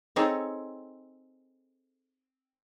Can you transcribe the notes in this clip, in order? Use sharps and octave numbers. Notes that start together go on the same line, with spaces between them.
C4 D#4 G#4 A4 C#5